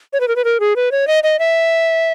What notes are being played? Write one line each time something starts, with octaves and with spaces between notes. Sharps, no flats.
C#5
B4
A#4
B4
A#4
G#4
B4
C#5
D#5
D#5
E5